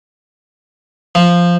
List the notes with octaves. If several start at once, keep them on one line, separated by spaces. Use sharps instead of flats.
F3